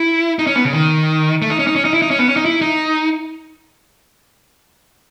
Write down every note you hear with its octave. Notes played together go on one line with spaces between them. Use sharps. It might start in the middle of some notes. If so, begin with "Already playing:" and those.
Already playing: E4
D#4
C#4
B3
C#3
D#3
A3
D#4
C#4
D#4
C#4
D#4
E4
D#4
C#4
B3
C#4
D#4
E4
D#4